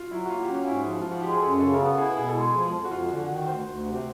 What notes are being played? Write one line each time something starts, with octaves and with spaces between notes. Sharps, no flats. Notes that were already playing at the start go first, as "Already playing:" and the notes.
Already playing: F4 F#4
F#3 E4
F#4
A#3 F4
G4
C#4 F#4
G#2 E4
F3
F3 F4
F#4
G#3 G4
G#4
F#2 A4
C#3 A4
A#4
B3 A4
E4 G#4
B2 G#4
A4
G#3
G#4
F3
F2
F#4
F2 F4
D3 F#4
D#3 F#4
D2 C5
D2
C3